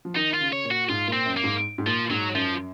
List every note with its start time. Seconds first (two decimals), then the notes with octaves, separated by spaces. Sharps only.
0.05 F3
0.16 D#3 D#4
0.34 F4
0.41 C#3
0.53 C#5
0.65 A#2
0.71 F#4
0.89 G#2 F4
1.08 A#2
1.13 C4
1.26 F#2
1.37 A#3
1.43 G#2
1.78 G#2
1.86 A#2 F3
2.10 G#2 F#3
2.35 F#2 F3